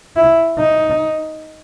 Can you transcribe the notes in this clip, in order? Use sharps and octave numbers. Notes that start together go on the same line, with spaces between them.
E4
D#4